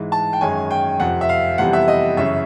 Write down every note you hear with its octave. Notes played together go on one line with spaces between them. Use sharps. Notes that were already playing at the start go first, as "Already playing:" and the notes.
Already playing: G#2 E3 G#3
A5
G5
F#2 D#3 G#3 C#4 G#5
G5
F2 C3 F3 F#5
E5
F5
F2 C3 E3 G3 B3 F#5
E5
D#5
F#2 C#3 E3 E5